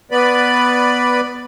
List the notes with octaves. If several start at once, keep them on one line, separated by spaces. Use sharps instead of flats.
B3 B4 D5 B5